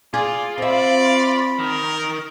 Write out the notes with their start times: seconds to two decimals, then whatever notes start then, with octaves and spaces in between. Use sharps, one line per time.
0.14 F4 G#4 D5
0.58 C4 D5 E5 B5
1.59 D#3 A#4